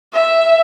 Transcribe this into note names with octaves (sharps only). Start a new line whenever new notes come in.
E5